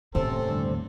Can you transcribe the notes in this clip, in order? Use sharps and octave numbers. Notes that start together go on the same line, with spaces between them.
D#2 A2 C3 C4 C#4 A4
G2 D3